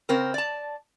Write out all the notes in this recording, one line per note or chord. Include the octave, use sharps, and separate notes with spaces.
C#3 C4 A#4
D5 A5